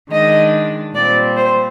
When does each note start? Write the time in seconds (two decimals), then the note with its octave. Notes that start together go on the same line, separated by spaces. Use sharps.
0.10 D#3 G#3 D4 D#5
0.95 A#2 G3 C4 D5
1.36 C5